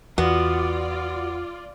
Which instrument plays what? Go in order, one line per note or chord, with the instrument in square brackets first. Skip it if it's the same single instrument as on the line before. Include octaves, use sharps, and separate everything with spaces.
[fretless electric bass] E2 [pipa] B3 [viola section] F4 D5 [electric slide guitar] F#4